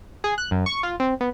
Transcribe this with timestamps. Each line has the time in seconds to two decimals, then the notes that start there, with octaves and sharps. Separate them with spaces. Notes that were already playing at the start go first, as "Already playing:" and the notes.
0.24 G#4
0.38 F#6
0.51 F#2
0.66 C#6
0.83 F4
1.00 C4
1.21 B3